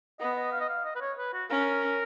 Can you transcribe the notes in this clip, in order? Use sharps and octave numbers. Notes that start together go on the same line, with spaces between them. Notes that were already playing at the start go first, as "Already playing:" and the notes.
B3 D#5
D#5
F5
D#5
F5
D#5
B4
C#5
B4
F#4
C#4 A#4